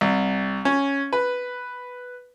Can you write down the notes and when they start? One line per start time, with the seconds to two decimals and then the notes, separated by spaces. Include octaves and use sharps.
0.01 C2
0.65 C#4
1.13 B4